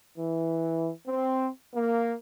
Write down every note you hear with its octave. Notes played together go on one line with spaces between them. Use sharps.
E3
C4
A#3